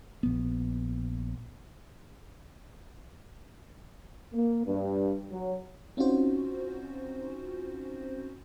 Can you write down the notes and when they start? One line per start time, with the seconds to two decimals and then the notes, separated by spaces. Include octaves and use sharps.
0.23 A#1 B3
4.33 A#3
4.65 G2
5.31 F#3
5.97 C4 C#4 D#4 F4 F#4 C5